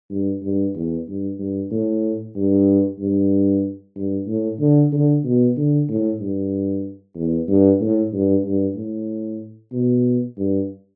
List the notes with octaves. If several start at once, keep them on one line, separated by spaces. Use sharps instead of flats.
G2
G2
E2
G2
G2
A2
G2
G2
G2
A2
D3
D3
B2
D3
A2
G2
E2
G2
A2
G2
G2
A2
B2
G2